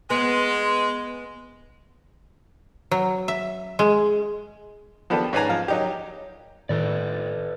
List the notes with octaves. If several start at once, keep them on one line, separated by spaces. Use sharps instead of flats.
G#3 B3 C6
F#3
E5
G#3
F3 B3 D4 G4 A4
G#2 C#4 B4 D5 G#5 A#5
F3 F5
F#3 D#4 G4
A2 D#3 A4 B4 D5